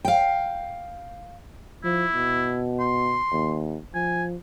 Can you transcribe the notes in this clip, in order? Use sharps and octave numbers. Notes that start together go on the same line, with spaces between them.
F5 G5
F3 E4
B2
C6
D#2
F3 G#5